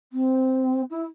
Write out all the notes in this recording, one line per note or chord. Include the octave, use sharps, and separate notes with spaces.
C4
E4